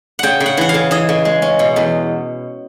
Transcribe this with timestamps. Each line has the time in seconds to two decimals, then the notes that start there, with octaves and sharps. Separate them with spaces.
0.19 C#3 F#5 G5
0.40 C#3
0.46 F#5
0.57 E3 F#5
0.69 F5
0.74 C#3
0.91 E3 D#5
1.09 C#3
1.25 G#3
1.42 C#4
1.59 B2
1.76 E2